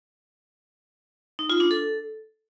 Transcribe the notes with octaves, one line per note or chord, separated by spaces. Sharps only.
D#4
F4
D4
A4